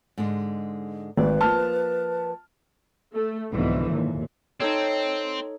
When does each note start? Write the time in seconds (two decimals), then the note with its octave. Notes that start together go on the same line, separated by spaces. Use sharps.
0.18 G#2 D3 G#3
1.17 G#1 B4 D5
1.41 F3 A#3 A5 F6
3.13 A3
3.53 C2 G#2 B2 D3 E3 F3
3.91 D#2 A#2
4.60 C4 D#4 A4 C#5